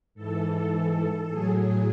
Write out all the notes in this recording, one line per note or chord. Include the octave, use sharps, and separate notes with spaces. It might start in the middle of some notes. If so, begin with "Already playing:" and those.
G#2 E3 A4
A2 F#3 G#4
G#4